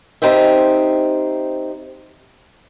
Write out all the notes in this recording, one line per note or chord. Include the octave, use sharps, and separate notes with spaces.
C4 D#4 G4 C5 E5